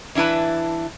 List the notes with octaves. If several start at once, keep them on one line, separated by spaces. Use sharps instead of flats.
E3 D4 E4 B4 A5